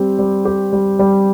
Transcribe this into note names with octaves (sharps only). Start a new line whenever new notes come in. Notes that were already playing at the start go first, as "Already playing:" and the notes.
Already playing: G3 C4 G4
G3
G4
G3
G3